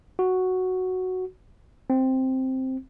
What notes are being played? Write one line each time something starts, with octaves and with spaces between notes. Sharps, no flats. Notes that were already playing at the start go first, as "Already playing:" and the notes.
F#4
C4